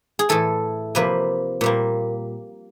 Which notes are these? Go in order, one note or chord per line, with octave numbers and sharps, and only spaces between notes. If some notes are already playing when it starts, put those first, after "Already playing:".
G#4
A2 E3 A3 A4
C3 F3 A#3 B4
A#2 G3 A#3